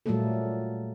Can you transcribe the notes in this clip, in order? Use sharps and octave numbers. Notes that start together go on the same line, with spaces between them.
A#2 F#3 G3 A3 A#3 A4